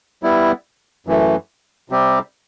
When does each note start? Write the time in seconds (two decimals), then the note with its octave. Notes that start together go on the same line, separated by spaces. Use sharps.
0.23 G3 B3 E4
1.07 F#2 E3 A3
1.90 C3 G3 C4 G4